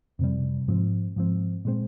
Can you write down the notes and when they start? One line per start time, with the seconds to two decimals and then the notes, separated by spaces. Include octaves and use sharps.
0.19 F2 C3 G3
0.68 G#2 F3 C4
1.16 G#2 F3 C4
1.65 A#2 G#3 C4